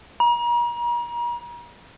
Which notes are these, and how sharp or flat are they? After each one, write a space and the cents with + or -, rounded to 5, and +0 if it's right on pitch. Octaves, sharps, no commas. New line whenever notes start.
A#5 +40